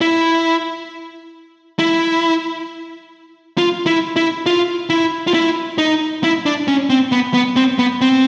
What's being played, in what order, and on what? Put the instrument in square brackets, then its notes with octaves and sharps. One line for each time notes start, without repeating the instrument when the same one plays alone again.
[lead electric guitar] E4
E4
F4
E4
E4
F4
E4
F4
E4
D#4
E4
D4
C#4
C4
B3
B3
C4
B3
C4